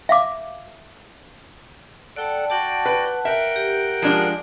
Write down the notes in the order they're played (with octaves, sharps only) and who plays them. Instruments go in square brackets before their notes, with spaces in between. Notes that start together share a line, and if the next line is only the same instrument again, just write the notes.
[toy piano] E5 F5 D6
[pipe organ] A4 F#5 [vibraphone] D5 G5 A5
[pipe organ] F#4 D5 G5 [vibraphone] F#5 A5
[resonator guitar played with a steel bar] B4
[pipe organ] A#4 F#5 G5 [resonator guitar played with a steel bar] E5
[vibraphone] G4
[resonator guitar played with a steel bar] F3 G#3 D4